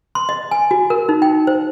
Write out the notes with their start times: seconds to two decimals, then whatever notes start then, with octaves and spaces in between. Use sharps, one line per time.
0.15 C6
0.29 D#5
0.51 G#5
0.71 F#4
0.90 A#4
1.09 D#4
1.22 G5
1.47 C5